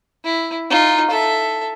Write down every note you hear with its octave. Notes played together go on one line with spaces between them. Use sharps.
E4
D#4 F4
A4 E5